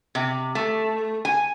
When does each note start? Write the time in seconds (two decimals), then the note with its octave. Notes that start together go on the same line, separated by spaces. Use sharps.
0.15 C3
0.55 A3
1.25 G#5